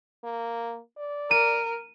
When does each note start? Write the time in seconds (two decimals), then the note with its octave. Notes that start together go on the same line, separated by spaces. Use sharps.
0.24 A#3
0.97 D5
1.31 A#4 D#7